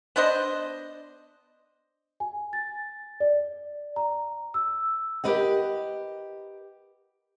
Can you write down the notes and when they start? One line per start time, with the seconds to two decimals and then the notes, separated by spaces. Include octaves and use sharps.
0.16 B3 D4 C5 D#5
2.20 G#5
2.53 A6
3.20 D5
3.96 A#5
4.54 E6
5.24 G4 A#4 B4 D#5 F#5